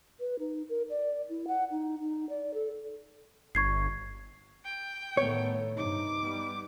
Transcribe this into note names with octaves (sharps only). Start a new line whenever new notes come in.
B4
D#4
A#4
D5
E4
F#5
D#4
D#4
D5
A4
G1 C#6 G#6 C7
G5
A2 D#3 A3 B3 C#5
G2 C3 D#4 D6
G3 B3